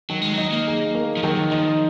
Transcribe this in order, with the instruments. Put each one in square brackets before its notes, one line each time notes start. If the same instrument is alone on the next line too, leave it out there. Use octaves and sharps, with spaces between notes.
[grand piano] D#3 [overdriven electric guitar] F#3
[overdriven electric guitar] G#3
F#3
[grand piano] D#4
[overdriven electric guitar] A#3
[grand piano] G#4
A#3
[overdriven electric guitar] F3
[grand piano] D#3 [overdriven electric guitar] F#3
[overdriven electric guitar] F3 [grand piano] D#4